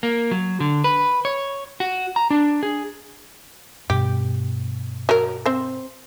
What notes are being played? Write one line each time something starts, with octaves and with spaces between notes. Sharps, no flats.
A#3
F#3
D3
B4
C#5
F#4
A#5
D4
G#4
G2 B2 G4
F#3 A#4
C4 C5